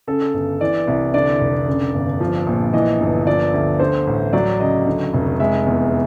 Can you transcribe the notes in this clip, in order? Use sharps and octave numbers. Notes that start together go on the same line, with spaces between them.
C#3 A4
G1
E3 D5
C2
D3 D5
F1
C#3
G1
F3
A#1
E3 D#5
G1
F3 D5
D2
D3 C5
A1
F#3 D5
C#2 D#5
D3
F1
G#3 E5
E2